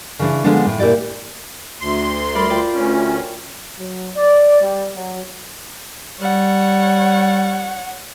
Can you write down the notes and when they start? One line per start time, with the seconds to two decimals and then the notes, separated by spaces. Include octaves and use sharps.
0.19 C#3 E3 D4
0.44 D3 F3 G#3 B3 D4
0.67 A2
0.80 A#2 E4 G4 D5
1.81 D2 C6
2.35 G3 A#4 D5 B5
2.50 F4 D5 G5
2.75 D2 C#4
3.79 F#3
4.16 D5
4.61 G3
4.95 F#3
6.20 G3 C#5 F#5